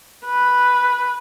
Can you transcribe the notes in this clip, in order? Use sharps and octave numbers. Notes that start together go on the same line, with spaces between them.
B4